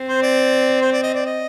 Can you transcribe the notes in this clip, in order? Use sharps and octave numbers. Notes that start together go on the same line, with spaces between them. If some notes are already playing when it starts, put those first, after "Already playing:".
Already playing: C4
C5
D5
C5
D5
D#5
D5
D#5